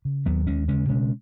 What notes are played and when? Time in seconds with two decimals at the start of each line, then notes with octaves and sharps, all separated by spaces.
0.05 C#3
0.26 D#2 F#3 B3
0.47 D#2 G#3 C#4
0.68 C#3 G#3 C#4
0.89 B2 G#3 C#4